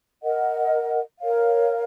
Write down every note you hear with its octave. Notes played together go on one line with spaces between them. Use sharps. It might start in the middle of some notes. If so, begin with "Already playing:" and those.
A#4 D#5 F#5
A#4 C#5 F5